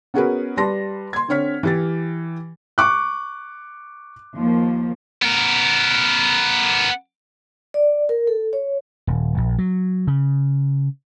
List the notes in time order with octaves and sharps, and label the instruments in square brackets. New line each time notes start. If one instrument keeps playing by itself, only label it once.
[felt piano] B3 C#4 F#4 G#4 A#4 B4
G3 B4 A5 C6 A#6
C6 G#6
D3 C4 C#5 F6 B6
E3 G4 A6
C#6 D6 F#6
[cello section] D#2 F3 A#3
[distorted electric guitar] B3 A#4
[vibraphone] D5
A#4
A4
C#5
[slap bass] D#1
A#1
F#3
C#3